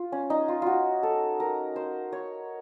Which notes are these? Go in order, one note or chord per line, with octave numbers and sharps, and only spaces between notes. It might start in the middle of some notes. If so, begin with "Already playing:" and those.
Already playing: F4
C#4
D#4
F4
F4 F#4
A4
A#4
C5
C#5